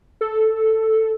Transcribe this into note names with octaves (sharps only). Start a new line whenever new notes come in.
A4